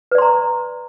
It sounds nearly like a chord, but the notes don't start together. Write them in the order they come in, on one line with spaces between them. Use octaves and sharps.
B4 D5 C6 A#5